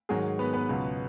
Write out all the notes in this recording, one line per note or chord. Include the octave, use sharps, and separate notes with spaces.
G#2 D#3 F#3 G#3 G#4
B3 B4
B3 B4
C#2 B2 F#3